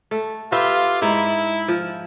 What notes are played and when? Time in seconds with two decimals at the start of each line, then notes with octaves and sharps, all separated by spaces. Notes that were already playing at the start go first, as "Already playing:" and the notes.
0.11 A3
0.52 F4 G4 B4 E5
1.02 G#2 D#4 E4
1.68 F3